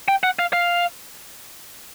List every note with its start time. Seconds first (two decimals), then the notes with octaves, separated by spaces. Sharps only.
0.08 G5
0.23 F#5
0.39 F5
0.53 F5